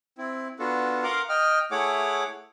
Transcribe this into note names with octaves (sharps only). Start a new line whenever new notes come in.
C4 E4
B3 D4 F4 F#4 A4
A#4 F5 F#5 A#5 C6 D6
D#5 G5 F6
A3 E4 G#4 C#5 F#5 D6